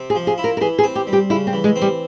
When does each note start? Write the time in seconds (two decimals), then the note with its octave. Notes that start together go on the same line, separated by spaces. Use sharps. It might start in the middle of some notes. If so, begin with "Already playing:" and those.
Already playing: C3
0.10 G#4
0.15 F3
0.27 G#4
0.38 E4
0.44 A#4
0.57 A#4
0.61 E3 G#4
0.78 G#4
0.83 C4
0.95 G4
1.07 G3
1.13 G4
1.30 C#3 E4
1.47 C4
1.53 E3
1.64 G#3
1.76 C4
1.82 G3